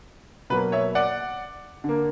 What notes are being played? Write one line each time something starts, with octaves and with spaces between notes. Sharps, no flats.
B2 F#3 A#3 B4
C#5 E5
D5 F#5
D3 A#3